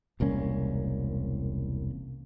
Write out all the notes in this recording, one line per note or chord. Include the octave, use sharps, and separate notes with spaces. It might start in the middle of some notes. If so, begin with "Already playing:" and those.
E1 C2 A#3 C#4